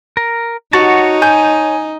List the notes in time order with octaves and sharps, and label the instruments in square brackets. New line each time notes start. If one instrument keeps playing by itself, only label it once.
[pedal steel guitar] A#4
[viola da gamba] D#4 [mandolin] F#4 [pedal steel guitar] C#5 A5
[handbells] G#5 [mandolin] G6